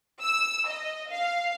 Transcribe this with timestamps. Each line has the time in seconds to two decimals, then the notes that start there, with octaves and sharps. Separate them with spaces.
0.22 E6
0.68 D#5
1.10 F5